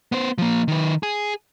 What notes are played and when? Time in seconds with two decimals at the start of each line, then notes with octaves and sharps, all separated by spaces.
0.12 B3 C5
0.38 F3 A#3
0.68 D#3 B4
1.03 G#4